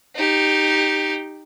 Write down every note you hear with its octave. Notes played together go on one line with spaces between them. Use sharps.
D#4 G4